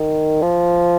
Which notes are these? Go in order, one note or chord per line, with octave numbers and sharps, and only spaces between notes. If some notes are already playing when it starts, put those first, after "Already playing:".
Already playing: D#3
F3